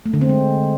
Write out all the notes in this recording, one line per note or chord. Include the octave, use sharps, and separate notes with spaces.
A3
D3
C4
G#3